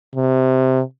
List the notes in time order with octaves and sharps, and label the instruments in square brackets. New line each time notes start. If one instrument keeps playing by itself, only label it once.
[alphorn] C3